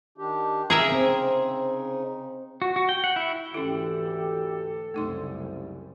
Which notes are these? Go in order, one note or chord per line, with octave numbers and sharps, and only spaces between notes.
D#3 D4 G4
C#3 D#4 G#4 A#4 E5
C4
F#4
F#4
G5
F#5
E4
D2 G#2 E3 C#4 E4 G4 A4
C2 F#2 C#3 G3 A3 D#4 C6